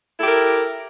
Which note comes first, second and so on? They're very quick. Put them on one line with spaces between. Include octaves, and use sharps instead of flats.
E4 A4 G4 A#4